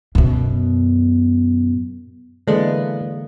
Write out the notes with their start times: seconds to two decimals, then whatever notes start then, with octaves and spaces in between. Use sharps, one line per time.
0.15 F#2 B2
2.48 D3 E3 G#3 A#3 B3 A4 D5